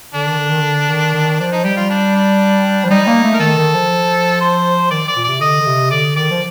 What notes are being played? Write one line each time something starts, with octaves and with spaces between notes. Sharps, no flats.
D3 D4
D#3
D3
D#3
D3
D#3
D#3
F3 D4
D#4
G3 G4
F4
D4
D4
F3
G3 D#4
A#3
A3
A#4
D#3 A4
D#3
F3
C5
D#3 D5
D5
A#2
C3 D5
D3 D#5
D3
C3
D3 D5
D#3 D5
F3